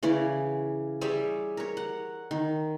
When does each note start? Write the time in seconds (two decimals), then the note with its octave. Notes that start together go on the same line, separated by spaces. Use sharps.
0.03 C#3 E3 C#4 D5
1.01 G3 G#4 C#5 E5
1.57 A#4 C#5
1.77 F#5
2.31 D#3